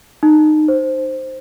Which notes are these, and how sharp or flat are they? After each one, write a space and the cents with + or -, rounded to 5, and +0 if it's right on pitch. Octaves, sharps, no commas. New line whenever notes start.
D#4 -20
C5 +5